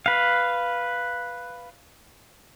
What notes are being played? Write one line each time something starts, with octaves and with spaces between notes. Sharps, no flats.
B4 F5